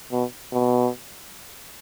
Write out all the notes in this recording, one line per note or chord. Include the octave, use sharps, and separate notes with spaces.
B2
B2